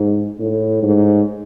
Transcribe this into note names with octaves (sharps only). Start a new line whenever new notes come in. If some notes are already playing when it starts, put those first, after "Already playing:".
Already playing: G#2
A2
G#2